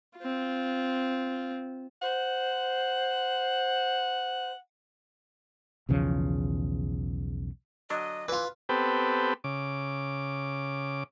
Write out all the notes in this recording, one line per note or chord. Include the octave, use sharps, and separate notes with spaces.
C4 F4
C5 F#5
B1 E2 C#3 F3
D3 F#3 D4 D#5
E3 F4 B4
B3 C4 G4 A4 B4
C#3 D6